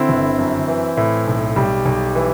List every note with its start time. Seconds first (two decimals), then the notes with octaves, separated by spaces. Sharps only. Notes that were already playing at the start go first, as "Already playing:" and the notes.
Already playing: D3 C4 E4
0.09 G1
0.38 F#2
0.68 E3
0.97 A2
1.27 B1
1.56 B1 G3
1.85 B1
2.15 E3